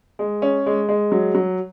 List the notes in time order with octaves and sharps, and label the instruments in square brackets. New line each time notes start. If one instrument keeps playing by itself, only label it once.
[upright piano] G#3
C#4
G#3
G#3
F#3
F#3